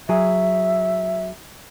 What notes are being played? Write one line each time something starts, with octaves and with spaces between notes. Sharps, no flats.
F#3 G#4 E5